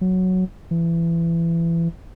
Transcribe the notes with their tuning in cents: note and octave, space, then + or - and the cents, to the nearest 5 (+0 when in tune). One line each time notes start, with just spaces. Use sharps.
F#3 +0
E3 +25